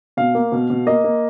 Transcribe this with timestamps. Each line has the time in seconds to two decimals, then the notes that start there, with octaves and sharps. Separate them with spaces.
0.17 B2 F5
0.35 A#3
0.52 B2
0.70 B2
0.87 A#3 D#5
1.04 A#3